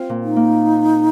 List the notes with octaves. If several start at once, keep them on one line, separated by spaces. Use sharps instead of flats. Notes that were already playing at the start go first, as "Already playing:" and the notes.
Already playing: C4 F4
A#2
D#4
A#3